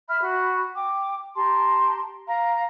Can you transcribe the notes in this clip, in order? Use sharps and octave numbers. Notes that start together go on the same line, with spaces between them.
E5 B5 F6
F#4 B5
G5 D6
G4 A5 A#5 C6
F5 A#5